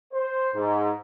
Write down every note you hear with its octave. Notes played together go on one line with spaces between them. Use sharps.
C5
G#2